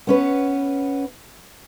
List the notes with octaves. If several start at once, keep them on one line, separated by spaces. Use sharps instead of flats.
B3 C#4 B4